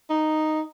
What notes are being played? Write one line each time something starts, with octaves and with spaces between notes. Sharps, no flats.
D#4